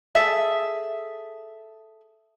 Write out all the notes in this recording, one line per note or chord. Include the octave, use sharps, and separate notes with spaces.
G#4 A4 E5